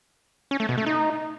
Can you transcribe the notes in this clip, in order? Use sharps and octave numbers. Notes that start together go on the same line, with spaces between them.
C#4
A3
B2
A3
D#4